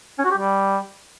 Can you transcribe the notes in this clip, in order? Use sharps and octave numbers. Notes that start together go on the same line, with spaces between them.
C#4
F#4
G4
G3